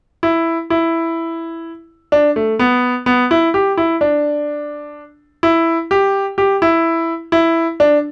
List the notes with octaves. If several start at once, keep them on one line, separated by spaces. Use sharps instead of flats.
E4
E4
D4
A3
B3
B3
E4
G4
E4
D4
E4
G4
G4
E4
E4
D4